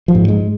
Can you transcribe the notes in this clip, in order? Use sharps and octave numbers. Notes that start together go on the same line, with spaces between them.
F3
G#2
G#3